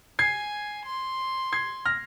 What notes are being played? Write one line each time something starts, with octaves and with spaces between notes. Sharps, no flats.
G#5 G#6 C7
C6
G#6 C7
F6 A#6